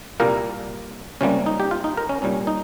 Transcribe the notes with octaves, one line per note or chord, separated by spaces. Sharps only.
C2 A#2 G3 A#3 A#4
C#2 C3 G3 A#3 C#4
D#4
G4
F4
D#4
A#4
C#4
C2 A#2 G3 C#4
D#4